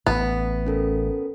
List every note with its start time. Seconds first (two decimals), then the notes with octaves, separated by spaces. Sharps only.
0.07 A1 A2 B3
0.66 C#4 A4 A#4